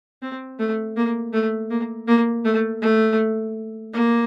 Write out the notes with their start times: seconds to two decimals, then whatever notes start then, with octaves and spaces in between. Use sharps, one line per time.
0.22 C4
0.59 A3
0.96 A#3
1.33 A3
1.70 A#3
2.07 A#3
2.45 A3
2.81 A3
3.93 A#3